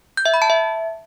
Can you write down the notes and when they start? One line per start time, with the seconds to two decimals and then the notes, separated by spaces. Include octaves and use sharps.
0.17 G6
0.26 E5
0.34 B5
0.42 A5
0.50 E5